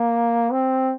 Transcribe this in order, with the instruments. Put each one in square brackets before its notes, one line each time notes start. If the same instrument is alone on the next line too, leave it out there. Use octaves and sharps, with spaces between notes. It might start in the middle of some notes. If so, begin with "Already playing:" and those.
Already playing: [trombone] A#3
C4